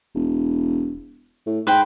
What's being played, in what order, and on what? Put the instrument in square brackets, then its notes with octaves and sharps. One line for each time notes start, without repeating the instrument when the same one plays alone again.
[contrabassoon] E1
A2
[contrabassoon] G#2 [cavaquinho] B4 C5 G5